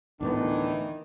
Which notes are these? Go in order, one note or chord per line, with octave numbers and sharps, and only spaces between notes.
D2 A2 D#3 E3 B3 D4